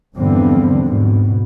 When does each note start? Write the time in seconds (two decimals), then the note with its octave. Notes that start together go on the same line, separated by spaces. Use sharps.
0.16 E2 G2 D3 F3 C4
0.83 G#2 B2